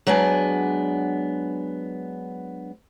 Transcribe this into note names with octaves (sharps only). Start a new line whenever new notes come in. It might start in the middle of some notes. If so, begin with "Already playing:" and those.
F#3 G#3 B3 D4 G#5